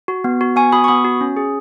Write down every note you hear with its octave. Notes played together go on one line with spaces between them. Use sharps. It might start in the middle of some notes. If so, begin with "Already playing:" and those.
F#4
B3
F#4
B3 G#5 C#6
F#4 B5 D#6
C#6
B3 B5 D#6
F#4
C#4
G#4